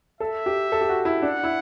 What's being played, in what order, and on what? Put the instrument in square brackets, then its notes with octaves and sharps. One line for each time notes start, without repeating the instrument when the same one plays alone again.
[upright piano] A4 [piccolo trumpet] E5
[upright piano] G4
A4
G4
F#4
E4
[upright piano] D4 [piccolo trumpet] F#5
[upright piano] E4